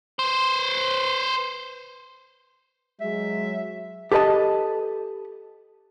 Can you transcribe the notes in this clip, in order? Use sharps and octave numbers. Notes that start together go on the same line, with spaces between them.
B4 C5
F#3 G#3 E5
G4 A4 B4 D#5 A5